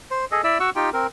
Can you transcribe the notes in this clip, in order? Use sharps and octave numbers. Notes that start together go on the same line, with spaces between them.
C5
G#4 A4 D#5
E4 D5 E5 E6
F#4 F#5 C#6 E6
D#4 F4 G4 G5
C4 A#4